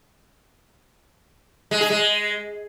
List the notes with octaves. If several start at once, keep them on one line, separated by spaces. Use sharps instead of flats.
G#3
G#4
G#3